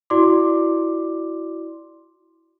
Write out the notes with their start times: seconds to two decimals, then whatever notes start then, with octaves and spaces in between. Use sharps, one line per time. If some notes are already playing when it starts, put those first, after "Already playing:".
0.10 E4 F#4 D5 C6 D6